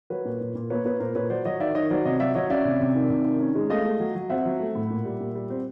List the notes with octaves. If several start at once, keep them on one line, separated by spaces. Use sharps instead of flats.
F#3 B4 C#5
A#2
A#2
A#2
A#3 B4 C#5
A#3 B4 C#5
A#2 A#4 C5
A#2 B4 C#5
F#3 C5 D5
F#3 C#5 D#5
D#3 D5 E5
D#3 C#5 D#5
F#3 C5 D5
C3 C#5 D#5
F#3 D5 E5
F#3 C#5 D#5
C#4 D5 E5
C3
C3
D#3
C3
D#3
C#4
G#3
A3 D#5 F5
A3
F#3
F#3
C4 E5 F#5
F#3
A3
A2
A#2
G3
A#2
G3
C4